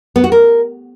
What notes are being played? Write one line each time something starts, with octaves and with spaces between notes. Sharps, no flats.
B3
F#4
A#4